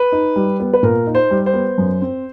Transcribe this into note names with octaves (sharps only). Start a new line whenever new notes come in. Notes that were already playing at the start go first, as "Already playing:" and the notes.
Already playing: B4
D#4
G3
B3
B4
A#2 A#4
D#4
C5
G3
C5
B3
F#2
C4